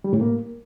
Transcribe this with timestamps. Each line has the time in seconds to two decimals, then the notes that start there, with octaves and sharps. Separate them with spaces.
0.04 G3
0.13 A2
0.21 A#3